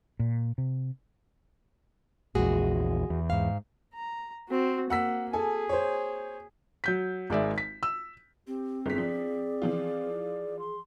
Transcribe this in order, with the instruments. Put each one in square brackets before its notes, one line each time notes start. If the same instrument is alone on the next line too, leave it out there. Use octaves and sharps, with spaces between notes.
[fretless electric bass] A#2
C3
[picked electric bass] A#1 E2 [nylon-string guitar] G#3 F#4 G#4
[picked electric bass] E2
[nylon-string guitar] G#2 F5
[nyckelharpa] A#5
C4 F#4
[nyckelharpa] A#3 [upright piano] F#5 E6 B6
[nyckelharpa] G#4 [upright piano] A4 G#5
[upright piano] C5 C#5
[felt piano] F#3 G6 B6
G#1 G#3 D5 E5
B6
E6
[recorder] C4 [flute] G4
[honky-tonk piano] G1 B6 [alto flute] G#4
[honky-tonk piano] F3 [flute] D5
[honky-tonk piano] E3 F3 F4
[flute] C6